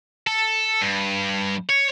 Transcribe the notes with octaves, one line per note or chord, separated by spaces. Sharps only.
A4
G2
C#5